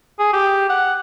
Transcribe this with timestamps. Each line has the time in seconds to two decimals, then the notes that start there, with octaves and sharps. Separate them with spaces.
0.19 G#4
0.33 G4
0.69 F#5